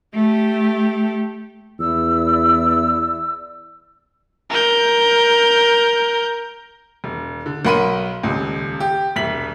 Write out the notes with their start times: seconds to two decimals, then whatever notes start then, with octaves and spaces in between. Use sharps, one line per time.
0.14 A3 G4
1.79 E2 E4 D5 E6
4.50 A#4 G6
7.04 E1
7.46 D3
7.65 B1 A#4 F#5 B5 C6 D#7
8.23 D#1 C#2
8.80 G4
9.16 E1 C2 B6 F#7